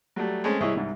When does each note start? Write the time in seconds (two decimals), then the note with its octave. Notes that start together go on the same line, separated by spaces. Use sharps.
0.16 F#3 G3 A3
0.44 G#3 A3 C4 C#4
0.60 C2 E4 G#4 C#5 D#5
0.75 C2 G#2